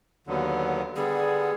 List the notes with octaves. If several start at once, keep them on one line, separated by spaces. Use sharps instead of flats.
D#2 D3 F#3 B3
D3 G3 B3 G#4